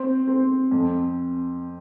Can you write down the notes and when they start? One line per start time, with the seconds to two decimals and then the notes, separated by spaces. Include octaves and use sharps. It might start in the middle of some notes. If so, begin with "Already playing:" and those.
Already playing: C4 C5
0.27 C4
0.71 F2